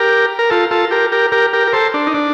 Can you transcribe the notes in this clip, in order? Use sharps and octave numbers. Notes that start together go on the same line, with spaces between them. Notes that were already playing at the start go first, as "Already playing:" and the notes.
Already playing: G4 A#4
A#4
F4 A4
F4 A4
G4 A#4
G4 A#4
G4 A#4
G4 A#4
A#4
A4 C5
D4
D#4
D4